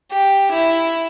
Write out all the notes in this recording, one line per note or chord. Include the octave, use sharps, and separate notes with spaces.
G4
E4